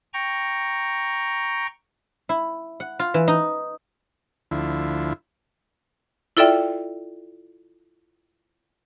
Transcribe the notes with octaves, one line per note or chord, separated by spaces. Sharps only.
G5 A#5 C#6
E4
F#5
F4
E3
D#4
D2 F3 E4
E4 F4 A4 D5 E5 G5